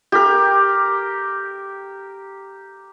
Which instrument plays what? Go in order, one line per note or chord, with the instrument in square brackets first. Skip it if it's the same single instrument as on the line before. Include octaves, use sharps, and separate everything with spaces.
[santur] G4 A#4